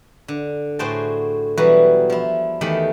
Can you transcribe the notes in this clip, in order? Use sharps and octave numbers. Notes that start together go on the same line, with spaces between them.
D3
A2 F#4 G#4 C5 G5 A5
B2 E3 F#3 G3 F#4
F3 E4
E2 D#3 A3 G4 B5